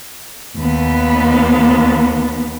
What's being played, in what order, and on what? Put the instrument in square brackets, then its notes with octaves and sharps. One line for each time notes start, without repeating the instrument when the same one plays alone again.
[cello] D#2 B3